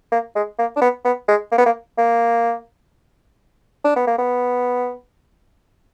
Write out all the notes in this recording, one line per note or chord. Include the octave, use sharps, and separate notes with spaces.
A#3
G#3
A#3
D4
B3
B3
G#3
A#3
B3
A#3
A#3
D4
B3
A#3
B3